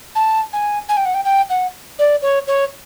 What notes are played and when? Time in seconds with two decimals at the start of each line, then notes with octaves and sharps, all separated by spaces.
0.15 A5
0.53 G#5
0.89 G#5
0.97 G5
1.05 F#5
1.14 G5
1.25 G5
1.50 F#5
1.99 D5
2.22 C#5
2.47 C#5